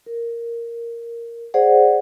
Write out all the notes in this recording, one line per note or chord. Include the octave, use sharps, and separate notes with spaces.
A#4
G#4 C5 D5 F#5